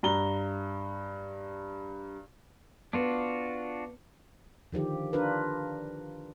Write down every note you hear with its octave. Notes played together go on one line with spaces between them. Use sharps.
G2 A#5 G7
B3 D4 F4 F#4
D3 D#3 F3 G4
D4 F4 A#4 B4